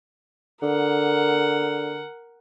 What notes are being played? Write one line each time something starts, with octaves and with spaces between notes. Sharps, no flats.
D3 A#4 F#5